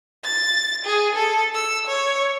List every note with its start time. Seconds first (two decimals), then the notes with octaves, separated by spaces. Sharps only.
0.24 A6
0.85 G#4
1.15 A4
1.55 E6
1.88 C#5